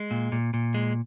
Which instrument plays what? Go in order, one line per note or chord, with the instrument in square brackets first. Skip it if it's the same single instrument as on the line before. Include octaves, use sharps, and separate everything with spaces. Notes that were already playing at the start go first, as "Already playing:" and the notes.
Already playing: [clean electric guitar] G#3
A#2
A#2
A#2
G#3